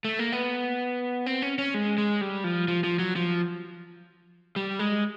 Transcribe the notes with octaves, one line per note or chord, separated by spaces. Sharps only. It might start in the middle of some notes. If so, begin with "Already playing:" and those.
A3
A#3
B3
C4
C#4
C#4
G#3
G#3
G3
F3
F3
F3
F#3
F3
G3
G#3